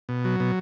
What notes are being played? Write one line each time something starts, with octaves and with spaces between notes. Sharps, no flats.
B2
F#3
B2